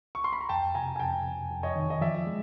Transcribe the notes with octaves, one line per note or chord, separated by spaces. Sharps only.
C#6
C6
B5
A#5
F2 G5 A5
C3 G#5 A#5
G#5
F2 G5 A5
F2
F2
C#5 D#5
D#3
D#5
F3 D5 E5
G#3